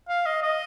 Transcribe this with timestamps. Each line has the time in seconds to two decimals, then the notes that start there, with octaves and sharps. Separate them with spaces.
0.09 F5
0.26 D#5
0.42 D#5